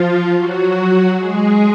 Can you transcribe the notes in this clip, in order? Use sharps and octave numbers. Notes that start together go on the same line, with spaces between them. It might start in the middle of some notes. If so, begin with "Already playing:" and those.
Already playing: F3 F4
F#3 F#4
G#3 G#4